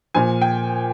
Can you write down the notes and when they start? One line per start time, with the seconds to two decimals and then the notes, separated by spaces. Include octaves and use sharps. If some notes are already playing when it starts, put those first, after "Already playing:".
0.15 A#2 F3 G#5
0.42 G5